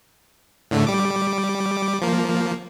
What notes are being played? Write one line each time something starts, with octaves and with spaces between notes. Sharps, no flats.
A2 D3 A3
G3 D6
F3 A#3